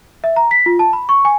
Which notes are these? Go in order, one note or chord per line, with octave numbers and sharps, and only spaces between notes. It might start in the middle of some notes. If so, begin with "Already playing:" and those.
E5
A#5
B6
F4
A5
B5
C#6
G#5